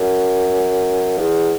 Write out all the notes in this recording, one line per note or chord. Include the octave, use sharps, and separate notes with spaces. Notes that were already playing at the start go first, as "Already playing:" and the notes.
Already playing: F#2
E2